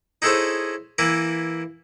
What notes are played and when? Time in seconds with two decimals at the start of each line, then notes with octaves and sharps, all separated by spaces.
0.22 D#4 E4 G#4 A4 C5 C#5
0.98 E3 A#3 E4 B4